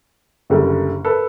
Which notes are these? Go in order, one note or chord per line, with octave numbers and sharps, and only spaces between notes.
F#1 F#2 D3 G3
A4 B4